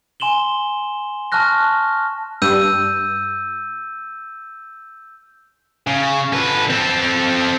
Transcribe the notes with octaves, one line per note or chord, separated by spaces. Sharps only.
G#5 C6 E7 F#7 G7
A5 C#6 F6 F#6 A#6
G2 E6 G6 D#7
C#3
D3 B4
C4 A4